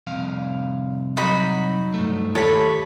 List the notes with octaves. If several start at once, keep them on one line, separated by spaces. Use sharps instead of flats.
C2 F2 F5
F#3 D#4 F#4 B5
G2 A3
D#2 A3 G4 A4 C#5 B5